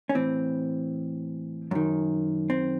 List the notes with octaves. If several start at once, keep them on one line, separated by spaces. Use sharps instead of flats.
C#4
A2 E3 C4
F#2 D#3
C4